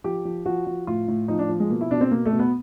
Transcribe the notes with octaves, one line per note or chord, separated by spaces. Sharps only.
F3 G4
F3
F3 F#4
F3
A2 F4
A2
F3 D#4
D4
F3
G#3
B2 A#3
E4
B2 D4
C4
B2 A#3
A3
B2
B3